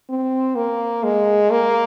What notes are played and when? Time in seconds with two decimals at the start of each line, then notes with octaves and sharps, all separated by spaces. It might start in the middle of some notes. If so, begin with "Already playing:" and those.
0.09 C4
0.55 A#3
1.04 G#3
1.51 A#3